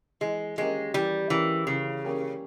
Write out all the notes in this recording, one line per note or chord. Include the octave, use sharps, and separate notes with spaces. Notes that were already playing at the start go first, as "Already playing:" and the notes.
E3 G#3
G#3 A#3 C#4 G4 A#4
E3 G3
E3 A#3 C#4 G4 A#4
C#3 E3
A#3 C#4 G4 A#4